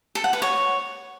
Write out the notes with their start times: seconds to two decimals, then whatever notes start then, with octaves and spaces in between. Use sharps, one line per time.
0.15 A4
0.24 F#5
0.33 B4
0.42 C#5